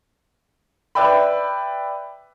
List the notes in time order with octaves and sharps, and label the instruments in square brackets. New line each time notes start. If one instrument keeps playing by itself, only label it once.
[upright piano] B4 D5 E5 G5 B5